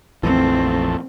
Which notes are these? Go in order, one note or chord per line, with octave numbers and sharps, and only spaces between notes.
A#1 F2 E3 A3 C4